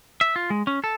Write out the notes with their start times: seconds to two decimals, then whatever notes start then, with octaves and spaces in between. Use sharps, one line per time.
0.21 E5
0.36 F4
0.50 G#3
0.67 C#4
0.84 A4